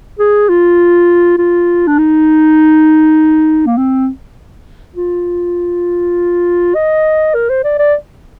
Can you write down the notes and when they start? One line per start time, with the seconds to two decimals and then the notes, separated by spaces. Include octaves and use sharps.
0.19 G#4
0.49 F4
1.38 F4
1.87 D4
1.98 D#4
3.67 A#3
3.77 C4
4.95 F4
6.75 D#5
7.34 A#4
7.50 C5
7.64 D5
7.79 D5